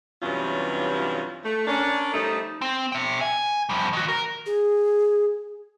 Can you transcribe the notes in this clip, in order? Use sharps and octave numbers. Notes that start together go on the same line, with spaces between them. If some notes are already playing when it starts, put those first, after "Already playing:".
G2 C3 E3 F#3 C#4 F4
A3
C#4 D4 A#4
F3 G3 A3 D#4
C4
E5 G5
G#5
F3 G3
D#3 F#4
A#4
G#4